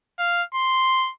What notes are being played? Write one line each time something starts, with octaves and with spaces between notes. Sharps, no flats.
F5
C6